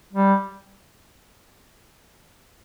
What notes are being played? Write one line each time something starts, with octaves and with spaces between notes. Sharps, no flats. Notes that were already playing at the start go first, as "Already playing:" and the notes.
G3